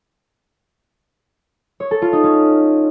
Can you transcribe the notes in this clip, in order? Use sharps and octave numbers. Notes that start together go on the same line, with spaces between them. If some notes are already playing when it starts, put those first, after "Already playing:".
C#5
A4
F4
D#4
C#4